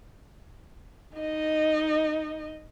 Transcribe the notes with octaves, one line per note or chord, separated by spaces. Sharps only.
D#4 D#5